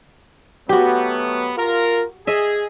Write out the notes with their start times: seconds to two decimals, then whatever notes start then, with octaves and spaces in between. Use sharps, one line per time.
0.69 F#3 A3 B3 F#4 G4
1.58 F4 A#4
2.27 G#4 D#5 E5